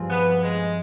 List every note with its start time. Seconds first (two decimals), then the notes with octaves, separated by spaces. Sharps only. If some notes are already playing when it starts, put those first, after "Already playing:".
Already playing: G2 F3 C4 F4 G#4
0.10 B3
0.43 G#3